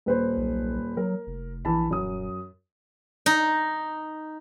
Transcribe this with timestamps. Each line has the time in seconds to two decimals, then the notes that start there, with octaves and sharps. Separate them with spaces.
0.06 D#1 B4 C5
0.37 B1
0.97 F#3 A#4
1.27 F1
1.65 A#1 E3 A5 B5
1.90 D#1 F#2 D#6
3.26 D#4